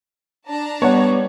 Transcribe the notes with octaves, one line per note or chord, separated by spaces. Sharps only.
D4 A5 A#5
G3 B3 C#5 F#5